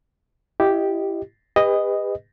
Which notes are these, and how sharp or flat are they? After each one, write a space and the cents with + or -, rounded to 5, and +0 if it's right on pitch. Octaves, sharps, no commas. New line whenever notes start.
E4 +25 G4 +0 D#5 +0
G4 +45 B4 +10 D#5 +0